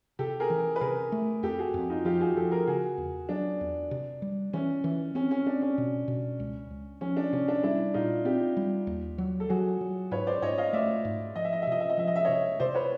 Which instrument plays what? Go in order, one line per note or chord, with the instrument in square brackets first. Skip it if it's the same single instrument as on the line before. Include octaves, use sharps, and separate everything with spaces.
[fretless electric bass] C3 [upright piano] G4 A4
[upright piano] G#4 A#4
[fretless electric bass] E3
[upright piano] B4
[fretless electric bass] C3 [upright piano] G#4 A#4
[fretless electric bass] A3
[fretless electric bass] F2 [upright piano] G4 A4
[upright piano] F#4 G#4
[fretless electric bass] F2
[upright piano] D#4 F4
[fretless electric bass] F3 [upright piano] F4 G4
[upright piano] F#4 G#4
[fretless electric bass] F3 [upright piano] G4 A4
[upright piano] G#4 A#4
[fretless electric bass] C#3 [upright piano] F#4 G#4
[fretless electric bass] E2
[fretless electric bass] F#3 [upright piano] D4
[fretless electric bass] E2
C3
G3
[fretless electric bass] E3 [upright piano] C#4
[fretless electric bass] E3
[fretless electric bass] C4 [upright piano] C#4
[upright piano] C#4
[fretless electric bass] C4 [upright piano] D4
[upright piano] C#4
[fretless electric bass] B2
B2
C#2
C#2
[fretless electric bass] F3 [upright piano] C#4
[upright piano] D4
[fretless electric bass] C3 [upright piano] C#4
[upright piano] D4
[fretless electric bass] G3 [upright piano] D4 E4
[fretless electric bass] A#2 [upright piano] D#4 F4
[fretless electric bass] C4 [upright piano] F4 G4
[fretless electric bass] G3
D#2
F#3
[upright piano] A4
[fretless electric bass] F#3 [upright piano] F#4 G#4
[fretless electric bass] F#3
[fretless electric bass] G#2 [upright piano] B4 C#5
[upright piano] C5 D5
[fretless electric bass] G#2 [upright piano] C#5 D#5
[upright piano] D#5 F5
[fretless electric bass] A3 [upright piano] D5 E5
[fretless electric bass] G#2
[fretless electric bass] F3 [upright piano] D#5
[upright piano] E5
D#5
E5
[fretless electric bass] C3 [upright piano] D#5
[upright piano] E5
D#5
[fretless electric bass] F3 [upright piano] E5
[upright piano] D#5
E5
[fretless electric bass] C3 [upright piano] C#5 D#5
[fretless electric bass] C3 [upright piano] C5 D5
[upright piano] B4 C#5